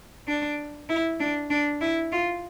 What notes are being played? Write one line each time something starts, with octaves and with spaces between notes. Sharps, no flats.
D4
E4
D4
D4
E4
F4